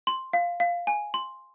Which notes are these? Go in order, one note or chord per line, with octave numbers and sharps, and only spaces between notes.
C6
F5
F5
G#5
C6